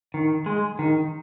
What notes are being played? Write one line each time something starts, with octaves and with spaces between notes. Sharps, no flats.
D#3
G#3
D#3